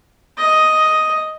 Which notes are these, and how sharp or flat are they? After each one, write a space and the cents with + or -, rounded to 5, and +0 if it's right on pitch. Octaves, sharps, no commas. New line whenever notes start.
D#5 +5